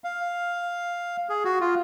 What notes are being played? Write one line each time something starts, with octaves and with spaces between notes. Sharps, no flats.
F5
G#4
F#4
F4